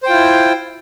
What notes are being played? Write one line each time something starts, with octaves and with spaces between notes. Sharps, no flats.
E4 F4 C5 G5